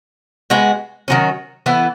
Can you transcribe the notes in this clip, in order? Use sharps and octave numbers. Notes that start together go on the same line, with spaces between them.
G#3 B3 F#4
D#3 F#3 C#4
E3 B3 E4 A4